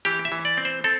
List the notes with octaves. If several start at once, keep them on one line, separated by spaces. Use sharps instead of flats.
E3 G4
E5
E3
D5
C4
C5
C4 A4